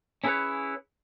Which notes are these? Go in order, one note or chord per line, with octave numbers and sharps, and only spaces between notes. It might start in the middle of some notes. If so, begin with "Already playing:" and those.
C#4 E4 G#4 A4 B4 C#5